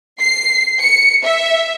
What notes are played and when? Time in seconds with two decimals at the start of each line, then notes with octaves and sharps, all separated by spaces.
0.20 C7
0.82 C#7
1.25 E5